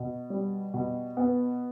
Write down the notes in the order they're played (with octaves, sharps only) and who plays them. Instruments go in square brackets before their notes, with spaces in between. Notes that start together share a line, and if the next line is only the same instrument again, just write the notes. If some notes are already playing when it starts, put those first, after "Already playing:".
Already playing: [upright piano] B2
G3
B2
B3